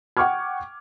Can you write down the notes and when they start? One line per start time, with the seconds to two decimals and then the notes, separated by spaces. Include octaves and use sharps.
0.17 F#5 G5 C#6 D6 F6 G#6